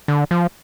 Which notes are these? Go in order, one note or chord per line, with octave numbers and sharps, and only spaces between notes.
D3
F3